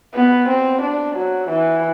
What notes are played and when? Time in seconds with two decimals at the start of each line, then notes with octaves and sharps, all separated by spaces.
0.14 B3
0.49 C4
0.82 D4
1.16 F#3
1.49 E3